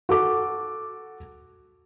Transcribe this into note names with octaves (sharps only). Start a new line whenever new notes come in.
F#4 A4 D6